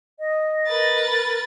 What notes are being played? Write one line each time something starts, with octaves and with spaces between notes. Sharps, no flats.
D#5
A#4 B4 A6